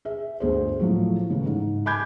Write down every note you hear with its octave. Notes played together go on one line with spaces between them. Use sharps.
G#4 E5
G1 D2 G#4 C5
A2 F3 F#3
A2 C#3 E3
G#2
G#5 B5 D6 G6 G#6